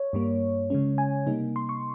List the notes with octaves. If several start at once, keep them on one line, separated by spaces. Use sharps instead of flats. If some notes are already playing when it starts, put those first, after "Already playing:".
Already playing: C#5
G2 G3 A#3
C#3 G#3 C#4
G#5
C3 G3 A#3 D#4
C6
C#6